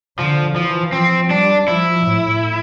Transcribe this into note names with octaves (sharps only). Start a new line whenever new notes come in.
D3 F3
E3 F3
F3 C4
G3 D4
F3 E4
A2